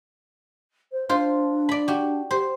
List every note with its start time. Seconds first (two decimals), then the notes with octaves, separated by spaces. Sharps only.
0.92 C5
1.09 D4 F4 C5
1.69 D5 B5
1.88 F#4 G4
2.31 G4 C5